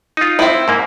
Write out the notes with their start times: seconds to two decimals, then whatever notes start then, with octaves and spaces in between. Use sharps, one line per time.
0.17 D#4 F4
0.39 C4 E4
0.68 G#2 A#3